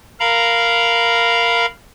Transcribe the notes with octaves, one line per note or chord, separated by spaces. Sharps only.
A#4 F5 A#5 B5